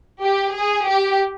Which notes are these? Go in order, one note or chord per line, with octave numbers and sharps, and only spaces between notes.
G4
G#4
G4